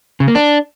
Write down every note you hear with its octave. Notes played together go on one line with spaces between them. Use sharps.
C#3
A#3
D4